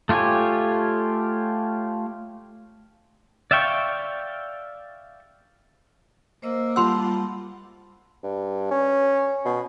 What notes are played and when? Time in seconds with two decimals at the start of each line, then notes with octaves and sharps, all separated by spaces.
0.09 A3 F4 G4 C#5 G#5
3.51 D5 E5 F5 G5 C#6
6.42 A#3 C5 D#5 E6
6.76 G3 F4 F#5 A5 B5 C6 E6
8.23 G2
8.71 C#4
9.45 B2